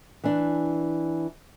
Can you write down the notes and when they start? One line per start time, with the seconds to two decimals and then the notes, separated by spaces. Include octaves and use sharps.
0.24 E3 D4